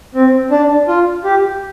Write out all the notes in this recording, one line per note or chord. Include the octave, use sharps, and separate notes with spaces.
C4
D4
F4
G4